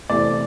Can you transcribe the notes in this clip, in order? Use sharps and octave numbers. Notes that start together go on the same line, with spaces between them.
C3 E3 A3 C4 D5